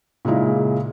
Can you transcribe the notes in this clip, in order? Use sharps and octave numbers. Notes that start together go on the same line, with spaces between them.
A#2 C#3 G#3 D#4 E4